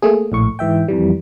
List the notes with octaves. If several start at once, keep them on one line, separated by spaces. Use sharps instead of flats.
A3 A#3 G#4
A#1 A2 C#6
G#2 E3 E5 G5
F2 E3 G3